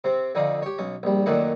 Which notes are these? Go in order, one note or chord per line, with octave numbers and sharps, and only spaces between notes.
C3 C4
F2 D3 D#4 D5 F5
G4 C#5
B1 C#4
A#1 G3
F#2 A#2 D#3 A3 D4 F#5